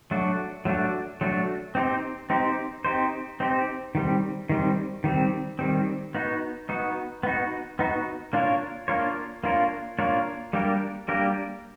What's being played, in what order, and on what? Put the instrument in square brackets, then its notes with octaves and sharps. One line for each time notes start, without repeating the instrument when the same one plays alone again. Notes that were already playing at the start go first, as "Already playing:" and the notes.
[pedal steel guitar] F#3 A3 D4 F#4
F#3 A3 D4 F#4
F#3 A3 D4 F#4
C4 D#4 G4 C5
C4 D#4 G4 C5
C4 D#4 G4 C5
C4 D#4 G4 C5
D#3 G3 C4
D#3 G3 C4
D#3 G3 C4
D#3 G3 C4
B3 D#4 F#4
B3 D#4 F#4
B3 D#4 F#4
B3 D#4 F#4
A#3 D4 F4 A#4 C#5
A#3 D4 F4 A#4 C#5
A#3 D4 F4 A#4 C#5
A#3 D4 F4 A#4 C#5
G3 A#3 D4 G4 A#4
G3 A#3 D4 G4 A#4